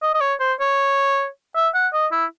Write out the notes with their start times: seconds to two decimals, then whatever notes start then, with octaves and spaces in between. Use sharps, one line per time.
0.02 D#5
0.14 D#5
0.21 C#5
0.40 C5
0.60 C#5
1.56 E5
1.75 F#5
1.93 D#5
2.12 E4